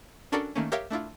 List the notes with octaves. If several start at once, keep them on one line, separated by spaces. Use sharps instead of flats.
C#4 D4 F#4 A4 A#4 D5
D#3 A3 A#3 C#4
G4 A#4 C#5 E5 F5 G5
A3 D4 E4 F4